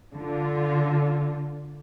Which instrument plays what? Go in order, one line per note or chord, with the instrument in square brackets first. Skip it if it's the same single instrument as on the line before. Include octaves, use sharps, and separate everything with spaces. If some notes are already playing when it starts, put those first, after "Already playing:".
[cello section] D3 F4